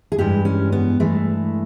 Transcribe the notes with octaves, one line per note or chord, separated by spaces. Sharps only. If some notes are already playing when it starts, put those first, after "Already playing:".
G#4
G2 E3 G#3 G4
C#4
B3
G2 E3 G#3 A3